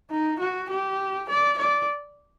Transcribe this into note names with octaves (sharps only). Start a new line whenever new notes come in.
D#4
F#4
G4
D5
D5